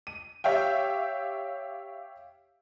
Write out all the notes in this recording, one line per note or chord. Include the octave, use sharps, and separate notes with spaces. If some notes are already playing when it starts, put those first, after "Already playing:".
D#7
G4 C#5 E5 F5 G5